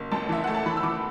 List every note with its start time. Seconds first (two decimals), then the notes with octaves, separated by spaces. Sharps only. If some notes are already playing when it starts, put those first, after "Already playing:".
Already playing: F#1
0.11 A1 A5
0.29 E3 E5
0.44 A3 F#5
0.55 A5
0.66 E3 B5
0.77 E6
0.83 E3 D6